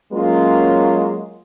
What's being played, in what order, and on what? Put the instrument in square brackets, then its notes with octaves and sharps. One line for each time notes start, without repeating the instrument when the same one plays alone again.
[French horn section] F#3 G#3 A#3 C#4 F4